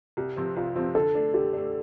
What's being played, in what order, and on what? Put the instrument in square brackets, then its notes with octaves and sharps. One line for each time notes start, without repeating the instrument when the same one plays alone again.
[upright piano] C2 [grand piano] G4
[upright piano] C3 F3 C4
[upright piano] C2 [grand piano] F4
[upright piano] C3 F3 C4 [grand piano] F4
[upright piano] D3 [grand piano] A4
[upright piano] A3 D4
[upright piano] D3 [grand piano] G4
[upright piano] A3 D4